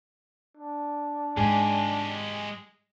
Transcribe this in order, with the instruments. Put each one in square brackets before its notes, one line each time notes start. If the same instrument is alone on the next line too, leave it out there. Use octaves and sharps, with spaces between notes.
[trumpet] D4
[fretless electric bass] G#2 [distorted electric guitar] G#3 G4 [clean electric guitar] G#4